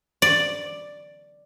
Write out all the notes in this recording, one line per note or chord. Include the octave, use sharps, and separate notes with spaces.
D5